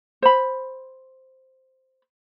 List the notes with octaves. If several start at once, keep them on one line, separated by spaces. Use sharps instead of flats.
C5 B5